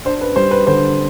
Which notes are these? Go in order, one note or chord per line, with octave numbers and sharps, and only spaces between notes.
D4 C5
B4
G3 C5
B4
D3 C5